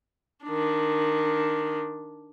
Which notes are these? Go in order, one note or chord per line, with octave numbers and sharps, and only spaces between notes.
D#3 D4